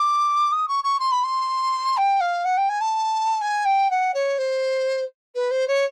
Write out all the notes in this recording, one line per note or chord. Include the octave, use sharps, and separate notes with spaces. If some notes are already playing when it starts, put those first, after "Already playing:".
Already playing: D6
D#6
C#6
C#6
C6
B5
C6
G5
F5
F#5
G5
G#5
A5
G#5
G5
F#5
C#5
C5
B4
C5
C#5